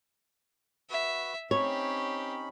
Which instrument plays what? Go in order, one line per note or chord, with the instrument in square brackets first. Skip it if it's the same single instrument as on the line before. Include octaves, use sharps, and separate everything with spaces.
[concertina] F#4 B4 [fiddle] E5
[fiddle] C4 G4 [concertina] C#4 D#4 B5 [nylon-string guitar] C#5